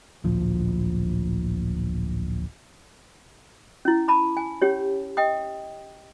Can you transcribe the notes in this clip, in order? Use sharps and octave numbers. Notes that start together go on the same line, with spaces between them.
D1 A#1 F3
C#4 E4
A5 B5 D6
G#5
C#4 G4 C#5
D#5 G5 D#6